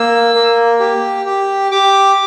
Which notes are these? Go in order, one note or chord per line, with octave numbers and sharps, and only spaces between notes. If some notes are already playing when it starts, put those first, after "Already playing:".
Already playing: A#3 E6
A#3
G4
G4
G4 D6